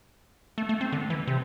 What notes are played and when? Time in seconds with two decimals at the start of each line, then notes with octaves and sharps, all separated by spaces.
0.58 A3
0.69 A3
0.81 C4
0.92 D3
1.10 E3
1.27 C3